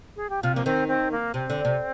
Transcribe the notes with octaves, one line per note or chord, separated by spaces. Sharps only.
G#4
G4
C3 F4
F3 A#3
D#3 C4
C4
A#3
C3 C4
D3
C3